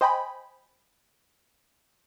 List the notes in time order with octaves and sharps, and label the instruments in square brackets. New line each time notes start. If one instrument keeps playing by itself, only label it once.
[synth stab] C5 D#5 G5 G#5 B5